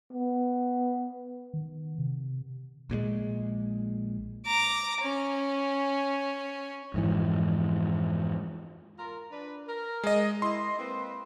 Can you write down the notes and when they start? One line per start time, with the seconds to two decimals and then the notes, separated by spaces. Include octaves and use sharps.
0.13 B3
1.54 D#3
1.99 C3
2.90 A#1 A#2 C#3 G#3
4.47 A#5 D6
5.01 C#4
6.94 F2 G#2 E3
8.98 F4 A#4
9.32 D4 B4 D5
9.67 A#4
10.04 G#3 D#5
10.42 E4 D#5 C6
10.79 A#3 C4 B4